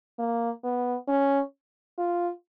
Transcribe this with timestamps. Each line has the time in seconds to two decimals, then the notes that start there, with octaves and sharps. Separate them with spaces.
0.19 A#3
0.64 B3
1.08 C#4
1.98 F4